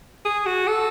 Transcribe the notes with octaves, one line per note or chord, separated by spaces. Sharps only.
G#4
F#4
A4